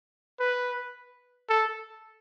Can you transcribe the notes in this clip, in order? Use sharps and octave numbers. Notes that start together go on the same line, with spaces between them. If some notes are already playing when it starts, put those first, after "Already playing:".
B4
A4